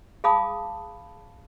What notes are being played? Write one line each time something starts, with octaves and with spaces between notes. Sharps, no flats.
G#4 F5 A5 B5 D6 D#6